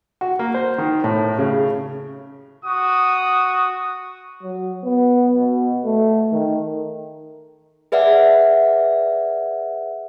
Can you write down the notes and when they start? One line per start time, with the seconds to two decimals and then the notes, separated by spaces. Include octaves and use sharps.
0.21 F#4
0.39 A#3
0.54 C5
0.78 D#3
1.04 A2
1.39 C#3
2.65 F#4 D#6
4.43 F#3
4.84 B3
5.35 B2
5.85 A3
6.32 D#3
7.92 G#4 B4 D5 E5 F#5